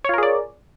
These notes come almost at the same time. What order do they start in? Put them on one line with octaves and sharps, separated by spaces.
C#5 F4 A#4 G#4 D5